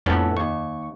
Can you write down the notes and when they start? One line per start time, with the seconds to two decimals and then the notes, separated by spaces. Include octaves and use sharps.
0.06 F2 A2 B3 C#4 D4 A4
0.37 D#2 C#6